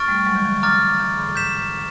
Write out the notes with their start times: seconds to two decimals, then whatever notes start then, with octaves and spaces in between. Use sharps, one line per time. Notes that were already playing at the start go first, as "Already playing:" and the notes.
Already playing: C#6 F6 A6 D7
0.08 G3 A3
0.27 F#3 G#3
0.36 D3 E3
0.45 D#3 F3
0.58 F#3
0.63 D#3 F3 A#5 D6 F6 A6
1.00 D3 E3
1.18 G#2
1.26 A2
1.35 G6 B6 E7